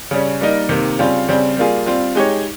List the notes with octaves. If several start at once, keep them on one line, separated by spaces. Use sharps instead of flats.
C#3 G3 C#4
G3 A#3 D#4 A#4
C3 D#3 A#3
C#3 G3 C4 F4
C#3 G3 C4
G3 A#3 F4 G#4
G3 C4 F4
G#3 D#4 G4 C#5